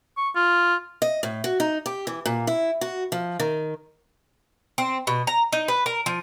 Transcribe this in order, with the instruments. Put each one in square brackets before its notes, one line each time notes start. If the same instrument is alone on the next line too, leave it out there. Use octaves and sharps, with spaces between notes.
[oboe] C#6
F4
[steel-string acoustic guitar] D#5
A2
F#4
D#4
G4
E3
A#2
E4
F#4
F3
D#3
[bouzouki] C4
B2
A#5
D#4
B4
A#4
F3